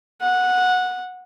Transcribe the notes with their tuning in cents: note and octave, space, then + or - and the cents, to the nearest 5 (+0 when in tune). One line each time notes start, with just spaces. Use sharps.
F#5 -15